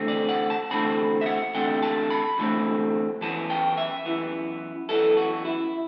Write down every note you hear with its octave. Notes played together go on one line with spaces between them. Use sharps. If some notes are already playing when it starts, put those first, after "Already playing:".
Already playing: E2 D3 A3 C4
D5
F#5
A5
E2 D3 A3 C4 B5
E5
F#5
E2 D3 A3 C4 G5
A5
B5
E2 D3 A3 C4
F#2 E3 B3 A5
G5
E5
F#2 E3 B3
F#2 E3 B3 A4
F#4
E4